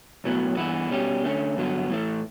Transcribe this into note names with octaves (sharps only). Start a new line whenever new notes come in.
B1 A2 F#3 B3
G2 E3 B3 E4
B2 G3 C#4 G4
D3 A3 C#4
G2 D3 F#3 B3
A2 E3 A3